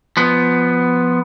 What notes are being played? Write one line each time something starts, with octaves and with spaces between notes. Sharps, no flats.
F3 B3